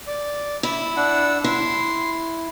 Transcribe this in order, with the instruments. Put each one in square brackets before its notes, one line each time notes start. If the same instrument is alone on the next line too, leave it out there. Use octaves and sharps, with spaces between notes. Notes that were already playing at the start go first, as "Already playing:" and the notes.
[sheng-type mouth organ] D5
[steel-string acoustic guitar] E4 [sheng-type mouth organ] E5
[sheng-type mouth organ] D4 F#5 E6
[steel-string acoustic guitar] E4 [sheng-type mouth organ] C6